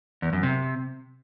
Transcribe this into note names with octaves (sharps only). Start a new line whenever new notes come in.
E2
F#2
C3